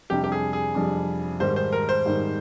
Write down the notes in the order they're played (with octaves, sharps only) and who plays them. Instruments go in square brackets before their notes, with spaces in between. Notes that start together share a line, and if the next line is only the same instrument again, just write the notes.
[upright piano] F2 C3 G3 D4 [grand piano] G4
[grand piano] G4
G#4
G#4
[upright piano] F2 C3 G3 D4
[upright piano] G#2 D#3 G3 [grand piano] C5
[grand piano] C5
A#4
C5
[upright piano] G#2 D#3 G3